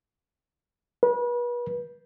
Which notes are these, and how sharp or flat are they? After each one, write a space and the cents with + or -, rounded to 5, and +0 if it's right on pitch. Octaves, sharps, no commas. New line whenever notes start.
B4 -35